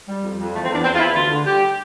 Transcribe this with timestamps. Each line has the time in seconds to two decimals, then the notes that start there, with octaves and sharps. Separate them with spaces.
0.08 G3
0.23 F2
0.39 F2
0.53 E2 A3
0.64 C4
0.70 E2 D4
0.84 E2 C4
0.95 F4
0.99 E2 E4
1.15 D2 F4
1.30 D3
1.46 G3 G4